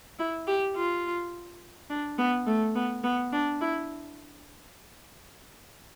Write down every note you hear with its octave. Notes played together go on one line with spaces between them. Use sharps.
E4
G4
F4
D4
B3
A3
B3
B3
D4
E4